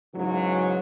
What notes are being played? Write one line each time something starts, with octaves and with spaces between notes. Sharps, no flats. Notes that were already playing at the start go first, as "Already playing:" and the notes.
G#2 C#3 E3 F#3